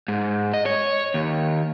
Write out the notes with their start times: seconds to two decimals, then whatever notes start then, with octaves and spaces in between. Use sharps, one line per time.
0.08 G#2
0.54 D#5
0.66 C#5
1.14 D#2